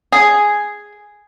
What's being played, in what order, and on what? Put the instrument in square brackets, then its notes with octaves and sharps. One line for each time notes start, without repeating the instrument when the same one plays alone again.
[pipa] G#4